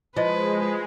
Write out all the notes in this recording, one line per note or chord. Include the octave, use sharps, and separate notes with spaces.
F3 G#3 E4 B4 C5 D#5